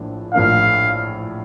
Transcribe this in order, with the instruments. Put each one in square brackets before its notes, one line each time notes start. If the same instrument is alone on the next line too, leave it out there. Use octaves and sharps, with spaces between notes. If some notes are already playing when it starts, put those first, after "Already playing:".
Already playing: [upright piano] A#1 A2 F3 A#3 D4
[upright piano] A#1 A2 F3 A#3 D4 [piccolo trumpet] F5